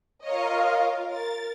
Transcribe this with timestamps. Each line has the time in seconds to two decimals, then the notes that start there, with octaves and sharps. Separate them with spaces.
0.23 F4 A#4 C#5 D#5 F5
1.07 A#4 A6